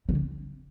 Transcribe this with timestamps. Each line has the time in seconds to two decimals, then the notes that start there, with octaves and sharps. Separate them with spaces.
0.09 D3